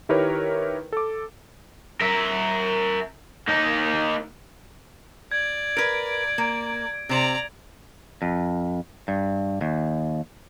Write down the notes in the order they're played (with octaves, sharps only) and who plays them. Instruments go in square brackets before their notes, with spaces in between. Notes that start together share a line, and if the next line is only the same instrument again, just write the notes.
[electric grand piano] D#3 E4 G4 A#4 B4 C#5
A4 D6
[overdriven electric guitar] A#4 E5
A#3 D#4
[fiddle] D5 [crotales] G#6
[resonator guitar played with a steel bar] A#4 B4 [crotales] G#6 D7
[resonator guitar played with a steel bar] A#3
[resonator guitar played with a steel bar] C3 C5 [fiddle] D5 A#5
[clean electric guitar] F2
G2
D#2